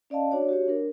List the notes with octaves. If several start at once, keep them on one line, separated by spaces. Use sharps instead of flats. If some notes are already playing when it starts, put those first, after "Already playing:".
C#4 D5 D#5 F5 A5
D4 F#4 C#5 D5
F#4 G4 C#5
D4 A#4